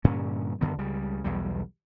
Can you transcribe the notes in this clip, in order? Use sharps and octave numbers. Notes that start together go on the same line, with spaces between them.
G2 A#2 D3 C#4
F#2 D3 D#3 B3
C#2 C#3 G3
B1 E2 G3